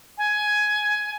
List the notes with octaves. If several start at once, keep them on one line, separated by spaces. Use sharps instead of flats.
G#5